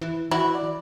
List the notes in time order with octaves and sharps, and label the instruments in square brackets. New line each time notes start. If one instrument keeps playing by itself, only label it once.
[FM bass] E3
[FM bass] E3 [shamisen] E4 [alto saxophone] F#4
[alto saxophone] D5